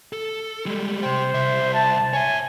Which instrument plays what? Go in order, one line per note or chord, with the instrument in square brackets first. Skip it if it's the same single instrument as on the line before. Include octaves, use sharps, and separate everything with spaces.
[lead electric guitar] A4
G3 G#3
[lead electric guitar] C3 G5 [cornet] C5
[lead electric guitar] C2 E5
[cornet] A5
[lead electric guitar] C#5 E5 [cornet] G#5